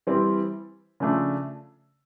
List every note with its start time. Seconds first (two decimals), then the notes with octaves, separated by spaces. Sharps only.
0.07 E3 G3 C4
1.00 C#3 F3 A3 D4